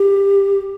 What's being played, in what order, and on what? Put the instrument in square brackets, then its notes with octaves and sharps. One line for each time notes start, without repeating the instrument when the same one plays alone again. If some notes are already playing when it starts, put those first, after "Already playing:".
Already playing: [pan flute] G4